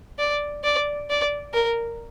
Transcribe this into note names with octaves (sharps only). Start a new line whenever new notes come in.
D5
D5
D5
A#4